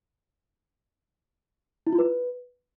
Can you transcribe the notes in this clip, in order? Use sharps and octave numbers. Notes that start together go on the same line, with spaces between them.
E4
F4
B4